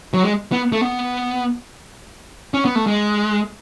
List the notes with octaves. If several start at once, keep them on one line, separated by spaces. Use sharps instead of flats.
F#3
G#3
B3
A3
B3
C#4
B3
A3
G#3